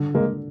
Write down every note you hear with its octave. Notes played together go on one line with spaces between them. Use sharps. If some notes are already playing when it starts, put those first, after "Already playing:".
Already playing: D3
D3 G#3 A#3